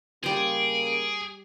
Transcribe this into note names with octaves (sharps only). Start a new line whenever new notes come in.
C#3 G3 A#3 G#4 C5 D7